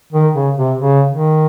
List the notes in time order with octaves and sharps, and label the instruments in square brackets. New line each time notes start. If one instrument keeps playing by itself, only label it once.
[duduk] D#3
C#3
C3
C#3
D#3